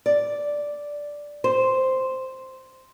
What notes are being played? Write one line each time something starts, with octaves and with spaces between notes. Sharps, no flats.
D5
C5